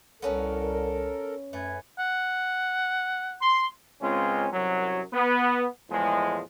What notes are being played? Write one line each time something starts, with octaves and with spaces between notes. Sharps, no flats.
C2 B3 C#4 F#4 A4 A#4
F#2 A3 B4 G#5
F#5
C6
C#2 G#3 C4 C#4 F4
C2 F#2 F#3
B3
E2 A2 F3 G#3